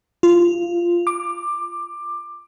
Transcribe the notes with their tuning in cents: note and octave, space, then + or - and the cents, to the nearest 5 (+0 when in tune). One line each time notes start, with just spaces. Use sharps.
F4 -15
D6 +15